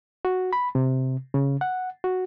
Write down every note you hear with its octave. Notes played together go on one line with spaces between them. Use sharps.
F#4
B5
C3
C#3
F#5
F#4